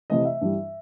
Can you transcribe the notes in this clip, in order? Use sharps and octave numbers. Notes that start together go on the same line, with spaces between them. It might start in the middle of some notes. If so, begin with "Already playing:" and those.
C3 E3 A3 C4 D#5
E5
G2 E3 G3